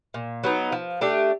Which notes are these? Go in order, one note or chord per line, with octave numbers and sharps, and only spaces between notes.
A#2
F#3 B3 D#4
F3
A3 D4 G4